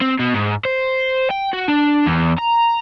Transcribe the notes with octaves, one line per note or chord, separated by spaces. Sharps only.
C4
B2
G#2
C5
G5
F#4
D4
E2
A#5